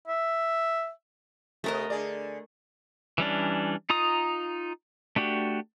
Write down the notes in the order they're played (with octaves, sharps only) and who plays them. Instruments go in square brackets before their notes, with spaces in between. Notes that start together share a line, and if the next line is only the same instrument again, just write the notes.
[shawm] E5
[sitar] C3 B3 [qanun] A3 A#4 D#5
[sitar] D3 G#4 D5
[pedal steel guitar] E3 G3 C#4 D4
D#4 F4 A#5 D#6
A3 D4 F#4 G4